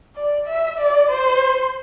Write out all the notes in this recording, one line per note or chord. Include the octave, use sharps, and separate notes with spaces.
D5
E5
D5
C5